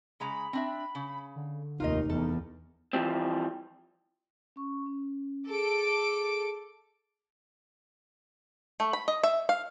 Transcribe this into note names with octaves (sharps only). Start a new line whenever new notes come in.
C#3 G#3 A#5 B5
C4 D4 E5
C#3
D3
F1 D#2 D#4 F4 A#4 D#5
E2 A4
E3 F3 G3 C4
C#4 C#6
C#4
G#4 A4 D6 D7
A3
B5
D#5
E5
F5